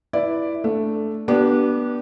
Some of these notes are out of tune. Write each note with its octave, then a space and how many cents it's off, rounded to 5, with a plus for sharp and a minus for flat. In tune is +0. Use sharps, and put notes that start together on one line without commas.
E4 +0 B4 -5 D5 +0
A3 +0 D4 +0
B3 -25 D4 +0 G4 -30